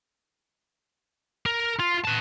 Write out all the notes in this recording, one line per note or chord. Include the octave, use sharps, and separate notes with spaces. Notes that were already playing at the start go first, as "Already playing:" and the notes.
A#4
F4
B4 A5